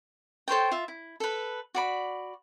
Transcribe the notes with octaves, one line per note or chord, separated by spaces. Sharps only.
A4 C5 C#5 G5
F4 E5
E4
A4 B4
F#4 D5 B5